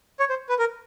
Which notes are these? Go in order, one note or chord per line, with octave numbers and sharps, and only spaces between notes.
C#5
C5
B4
A#4